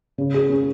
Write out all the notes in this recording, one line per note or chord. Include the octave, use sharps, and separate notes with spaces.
C#3
G#4
C#4